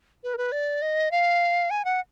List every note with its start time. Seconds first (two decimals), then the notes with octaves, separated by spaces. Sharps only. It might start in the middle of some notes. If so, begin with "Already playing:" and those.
0.24 B4
0.34 A#4
0.38 B4
0.52 D5
0.82 D#5
1.11 F5
1.70 G#5
1.85 F#5